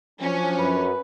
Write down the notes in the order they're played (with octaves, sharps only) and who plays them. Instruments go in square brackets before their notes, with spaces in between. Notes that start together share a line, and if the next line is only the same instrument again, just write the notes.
[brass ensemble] F3 F#3 D4 [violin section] C#4
[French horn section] F#2 [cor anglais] B4